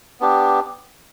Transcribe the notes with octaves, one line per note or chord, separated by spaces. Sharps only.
B3 D4 G4